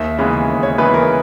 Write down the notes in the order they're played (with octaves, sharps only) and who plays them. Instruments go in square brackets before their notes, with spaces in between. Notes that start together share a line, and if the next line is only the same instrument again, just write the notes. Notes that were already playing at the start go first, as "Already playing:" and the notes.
Already playing: [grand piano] D#2 E5
C#3 E3 G#3 B3
D#2
C#5
C#3 E3 G#3 B3 B4
A#4